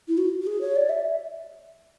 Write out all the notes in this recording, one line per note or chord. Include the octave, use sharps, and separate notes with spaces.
E4
F#4
F#4
G#4
C#5
D5
E5